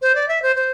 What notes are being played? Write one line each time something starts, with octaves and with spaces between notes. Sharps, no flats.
C5
D5
E5
C5
C5